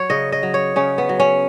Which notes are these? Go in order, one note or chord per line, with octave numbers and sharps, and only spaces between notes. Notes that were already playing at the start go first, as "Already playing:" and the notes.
Already playing: F#3 C#5
C#3 D#5
D#5
F#3
C#5
C#3 C#4
B3
F#3
C#4